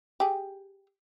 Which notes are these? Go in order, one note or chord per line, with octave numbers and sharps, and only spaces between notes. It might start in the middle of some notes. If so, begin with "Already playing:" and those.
G4 G#4